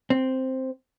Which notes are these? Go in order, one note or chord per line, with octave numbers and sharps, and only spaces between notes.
C4